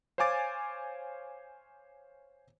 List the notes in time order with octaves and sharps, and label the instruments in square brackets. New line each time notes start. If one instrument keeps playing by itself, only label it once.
[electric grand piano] C5 C#5 F5 G#5 D6 A6